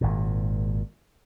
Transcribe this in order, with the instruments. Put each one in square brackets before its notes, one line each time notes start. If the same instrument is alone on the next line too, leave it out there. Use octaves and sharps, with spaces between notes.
[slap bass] G#1 A#2